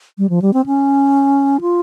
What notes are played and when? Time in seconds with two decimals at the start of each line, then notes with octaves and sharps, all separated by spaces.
0.18 G3
0.29 F3
0.42 G3
0.53 C4
0.66 C#4
1.61 F4